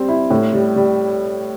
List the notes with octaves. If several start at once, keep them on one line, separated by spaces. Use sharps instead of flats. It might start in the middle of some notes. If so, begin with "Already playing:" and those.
Already playing: G3 C4
E4
A2
G3
G3